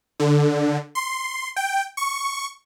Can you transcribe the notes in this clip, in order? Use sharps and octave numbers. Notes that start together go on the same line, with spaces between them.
D3
C6
G5
C#6